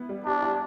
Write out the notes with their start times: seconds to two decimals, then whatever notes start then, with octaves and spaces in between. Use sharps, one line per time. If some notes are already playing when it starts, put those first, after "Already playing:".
Already playing: B3 E4
0.09 G3
0.26 D4 G4
0.42 E4